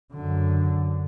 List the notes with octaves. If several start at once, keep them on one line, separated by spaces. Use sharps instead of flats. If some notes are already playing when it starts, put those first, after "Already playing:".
F#2 D3